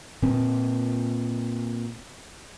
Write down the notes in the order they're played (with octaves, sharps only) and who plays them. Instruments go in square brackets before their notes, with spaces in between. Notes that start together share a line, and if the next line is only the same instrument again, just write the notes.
[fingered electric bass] A#2 C4